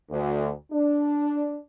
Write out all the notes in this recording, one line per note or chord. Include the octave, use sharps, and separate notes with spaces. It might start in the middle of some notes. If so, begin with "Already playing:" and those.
D2
D4